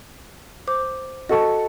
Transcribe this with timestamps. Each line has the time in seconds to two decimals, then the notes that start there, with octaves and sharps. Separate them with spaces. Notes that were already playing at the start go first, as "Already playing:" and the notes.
0.68 C5 D6
1.29 F#4 A4 D#5 A5 C#6